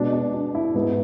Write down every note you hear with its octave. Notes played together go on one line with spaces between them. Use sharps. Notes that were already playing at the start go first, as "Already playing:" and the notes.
Already playing: B2 G#3 B3 D4
D4
D4
E4
G#2 G#3 B3 E4